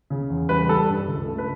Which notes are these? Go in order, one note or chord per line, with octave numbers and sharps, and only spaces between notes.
C#3
E2
G3 B4
G3 A4
G2
C#2
A3
B4